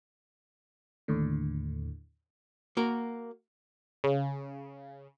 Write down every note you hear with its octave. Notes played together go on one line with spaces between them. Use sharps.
D#2 A2 D3
A#3 F#4 A#4
C#3